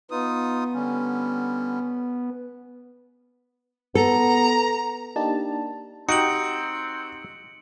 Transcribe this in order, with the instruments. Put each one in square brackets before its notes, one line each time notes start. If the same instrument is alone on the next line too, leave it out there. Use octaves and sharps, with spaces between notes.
[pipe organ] B3 [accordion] D#4 F4 D#6
[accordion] D3 G3 C#4
[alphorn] B3 [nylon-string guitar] A4 [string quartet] A#5
[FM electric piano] A#3 D4 D#4 G4 A5
[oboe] C4 [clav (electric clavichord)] D#4 [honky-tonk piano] F#4 G4 [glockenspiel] C#7 D7 F#7